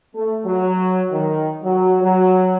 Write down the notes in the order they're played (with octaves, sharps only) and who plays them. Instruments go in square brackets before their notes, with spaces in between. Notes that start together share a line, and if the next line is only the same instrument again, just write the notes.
[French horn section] A3
F#3
D#3
F#3
F#3